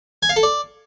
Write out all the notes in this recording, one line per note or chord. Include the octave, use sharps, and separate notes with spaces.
G#5
F5
A4
D5